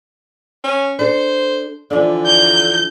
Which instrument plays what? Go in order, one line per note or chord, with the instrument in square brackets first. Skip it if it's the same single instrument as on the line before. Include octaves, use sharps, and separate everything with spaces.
[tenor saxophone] C#4
[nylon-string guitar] D4 A4 [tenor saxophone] C5
[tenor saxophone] D3 [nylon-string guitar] E3 F3 D4
[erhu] G6